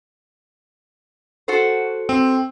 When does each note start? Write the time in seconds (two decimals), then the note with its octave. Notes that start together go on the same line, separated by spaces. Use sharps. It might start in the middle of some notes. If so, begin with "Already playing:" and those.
1.48 F#4 A4 C5
2.09 C4